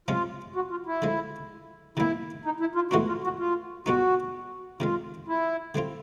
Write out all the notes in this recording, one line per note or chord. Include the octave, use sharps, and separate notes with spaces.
C3 F3 G#3 C#4 F4
F#4
F4
E4
D3 F3 G#3
C3 D#3 G3 A#3 E4
D#4
E4
F4
A2 E3 G#3 B3 D4 F#4
F4
F#4
F4
B2 G3 B3 D#4 F#4
C3 D#3 G#3 F4
E4
D3 G3 C4 F4